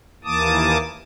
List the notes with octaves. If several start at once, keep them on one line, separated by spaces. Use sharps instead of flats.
D#2 E3 A#3 A5 D6 D#6